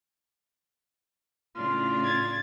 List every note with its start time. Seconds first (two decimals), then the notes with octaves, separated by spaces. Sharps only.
1.55 A2 C#3 D4 F4
2.04 G#6 A6